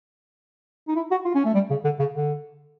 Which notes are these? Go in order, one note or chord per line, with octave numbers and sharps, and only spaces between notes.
D#4
E4
F#4
F4
C#4
A3
G3
C#3
D3
C#3
D3